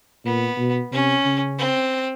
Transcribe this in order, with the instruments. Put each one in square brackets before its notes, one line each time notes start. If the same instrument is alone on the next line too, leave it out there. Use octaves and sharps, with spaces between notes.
[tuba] A#2 [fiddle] B3
[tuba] B2
[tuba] C3 [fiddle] C#4
[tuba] C#3
[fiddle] C4